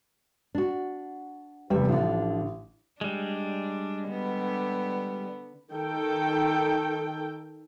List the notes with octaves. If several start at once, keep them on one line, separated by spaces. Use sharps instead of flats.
D4 F#4
F1 E2 G3 E5
A1 D3 F3 D4
G3 G#3 D4
D3 B3
D#3 A4 G5